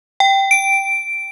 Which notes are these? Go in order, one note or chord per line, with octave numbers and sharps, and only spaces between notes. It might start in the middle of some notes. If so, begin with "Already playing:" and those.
G5
D7